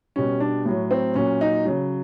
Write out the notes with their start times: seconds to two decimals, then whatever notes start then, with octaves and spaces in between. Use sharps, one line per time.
0.16 B2 G3 C#4
0.40 D4
0.65 A2 F#3
0.91 C4
1.15 A#2 F#3 C#4
1.41 D#4
1.65 C#3 F#3